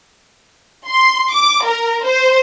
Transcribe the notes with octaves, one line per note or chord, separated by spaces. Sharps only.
C6
D6
A#4
C5